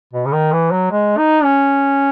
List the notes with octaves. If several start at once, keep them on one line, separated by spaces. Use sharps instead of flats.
B2
C#3
D#3
E3
F#3
G#3
D#4
C#4